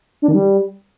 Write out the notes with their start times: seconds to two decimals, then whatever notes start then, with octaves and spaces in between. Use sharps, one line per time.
0.22 D4
0.28 D#3
0.34 G3